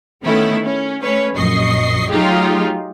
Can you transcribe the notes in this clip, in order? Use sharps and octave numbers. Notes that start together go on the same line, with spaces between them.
D#3 A3 B3 C#4 E4
C#4
A3 C#4 B4 C#5
A#1 F#2 D#5 C#6 C7
F#3 A3 D#4 F4 G4 G#4